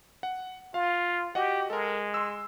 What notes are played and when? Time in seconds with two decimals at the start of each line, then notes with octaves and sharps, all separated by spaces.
0.23 F#5
0.74 F4 F5
1.35 F#4 G4 D#5 F#5
1.70 G#3 A4 A#4
2.14 C6 E6